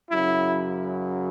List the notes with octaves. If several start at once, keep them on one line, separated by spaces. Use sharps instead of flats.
F#2 C#3 F#3 E4